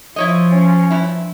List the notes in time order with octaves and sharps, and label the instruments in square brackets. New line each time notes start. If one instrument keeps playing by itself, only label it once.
[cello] F3 [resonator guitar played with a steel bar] E4 C#5 D#5
[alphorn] C#4
[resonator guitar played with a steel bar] G2 E4